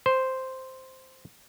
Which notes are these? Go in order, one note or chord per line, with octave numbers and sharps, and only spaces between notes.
C5